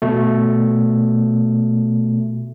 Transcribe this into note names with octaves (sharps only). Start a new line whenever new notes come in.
B2 A3